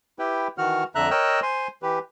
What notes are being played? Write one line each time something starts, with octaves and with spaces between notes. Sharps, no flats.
E4 G4 B4 G5
D#3 E3 F#4 F#5 F6
F2 D3 E5 A#5 F#6
A#4 C#5 D#5 G5 E6 F#6
C5 G#5 C6
E3 G4 B4